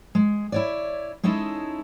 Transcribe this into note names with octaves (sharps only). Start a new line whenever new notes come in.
G#3
E4 C#5 D5
G#3 C#4 D#4 E4 A4